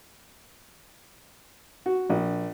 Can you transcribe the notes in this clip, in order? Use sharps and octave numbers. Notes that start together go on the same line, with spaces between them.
F#4
A#1